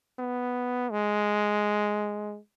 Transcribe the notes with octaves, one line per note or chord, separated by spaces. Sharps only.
B3
G#3